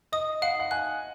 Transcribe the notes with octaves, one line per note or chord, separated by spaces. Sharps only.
D#5 D#6
F5 F#5
F#5
G#5 F#6